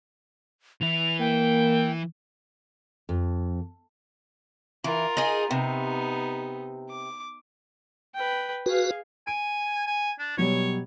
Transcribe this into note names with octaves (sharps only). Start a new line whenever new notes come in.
E3 E4 F7
A#3 G5
F2
E3 F4 A#4
D#4 G#4
C3 B3 D#4
D6
B4 G5
F#4 G#4 B4 F5
G#5 D7
G#5
D4
B2 F#3 G3 C#5